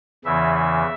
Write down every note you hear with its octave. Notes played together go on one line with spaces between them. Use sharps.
E2 C#3 E3 E5
E5